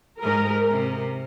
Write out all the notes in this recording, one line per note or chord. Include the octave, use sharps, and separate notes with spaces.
G#2 A#4
C3